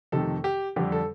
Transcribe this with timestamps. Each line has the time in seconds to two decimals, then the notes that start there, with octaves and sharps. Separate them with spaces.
0.12 F2 C3 D#3 A3 A4
0.44 G4
0.76 F2 D3 G3 G4
0.92 A4